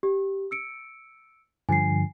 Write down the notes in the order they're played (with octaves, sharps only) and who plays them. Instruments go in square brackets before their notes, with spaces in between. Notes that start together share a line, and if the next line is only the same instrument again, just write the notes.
[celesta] G4
E6 C#7 D7
[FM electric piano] G2 D3 F3 [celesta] G#5 C7